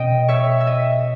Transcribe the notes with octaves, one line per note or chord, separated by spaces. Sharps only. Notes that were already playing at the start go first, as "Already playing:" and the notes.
Already playing: B2 C#4 C#5 D#5 G5
C#5 E5
E5
D#5